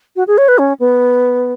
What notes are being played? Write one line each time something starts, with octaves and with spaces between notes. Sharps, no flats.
F#4
G#4
C#5
B4
C#4
B3